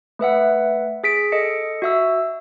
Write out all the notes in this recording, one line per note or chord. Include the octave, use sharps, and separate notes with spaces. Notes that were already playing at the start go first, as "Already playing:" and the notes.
A3 B4 E5 F#5
G#4 B6 D7
A4 D#5 C#7
F#4 E5 E6